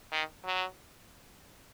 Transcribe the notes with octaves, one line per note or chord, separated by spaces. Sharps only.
D#3
F#3